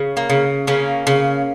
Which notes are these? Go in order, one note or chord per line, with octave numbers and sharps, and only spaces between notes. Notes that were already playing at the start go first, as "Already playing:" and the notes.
Already playing: C#3
A#3
C#3
C#3 A#3 C#4
C#3